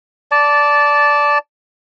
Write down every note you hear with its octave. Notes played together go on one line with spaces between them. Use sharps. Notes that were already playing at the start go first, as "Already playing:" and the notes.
D5 A5